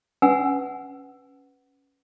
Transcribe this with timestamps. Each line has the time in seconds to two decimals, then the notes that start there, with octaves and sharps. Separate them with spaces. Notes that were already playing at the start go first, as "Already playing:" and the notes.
0.22 C#4 B4 F#5 G#5 E6